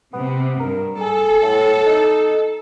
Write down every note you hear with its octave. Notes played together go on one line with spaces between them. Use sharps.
C3 B3
G2 A#4
G#4 A4
A2
D#4